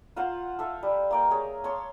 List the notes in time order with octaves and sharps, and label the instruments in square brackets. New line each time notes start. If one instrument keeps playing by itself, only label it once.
[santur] F4 C5 F5 F#5
A4 E5 F5
G3
A#3 D5 G5
G#4 C#5
C#5 A5 C6